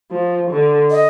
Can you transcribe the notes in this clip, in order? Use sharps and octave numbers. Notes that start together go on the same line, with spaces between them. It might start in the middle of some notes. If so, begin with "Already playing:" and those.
F3
D3
D#5